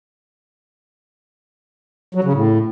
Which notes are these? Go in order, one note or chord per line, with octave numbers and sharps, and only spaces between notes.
F#3
C#3
A2